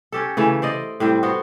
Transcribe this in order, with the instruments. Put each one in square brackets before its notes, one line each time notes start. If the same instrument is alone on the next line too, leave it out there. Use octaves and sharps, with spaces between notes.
[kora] C#4 G4 A4
C#3 E3 A3
C5 D5 D#5
A2 G3 C4
B3 F#4 C5